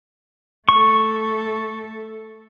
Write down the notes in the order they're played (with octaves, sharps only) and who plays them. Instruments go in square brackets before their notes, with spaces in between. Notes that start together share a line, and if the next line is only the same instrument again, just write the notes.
[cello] A3 A4 [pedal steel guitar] C#6